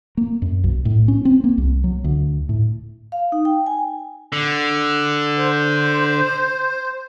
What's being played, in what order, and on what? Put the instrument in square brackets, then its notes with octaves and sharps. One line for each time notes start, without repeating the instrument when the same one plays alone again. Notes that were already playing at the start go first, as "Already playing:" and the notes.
[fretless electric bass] A#3
F#2
B1
A2
C#4
C4
A#3
C2
F#3
D2
A2
[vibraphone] F5
D#4
G5
G#5
[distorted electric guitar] D3
[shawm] C5